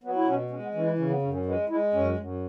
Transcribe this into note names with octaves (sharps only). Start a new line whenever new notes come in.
F#3 B3
E4
B2 C#4
G#3 C#4
B3
E3 C#4
E4
C#3 C#4
B3
F#2 C#4
C#4
G#3 B3
G#3 E4
F#2 C#4
F#2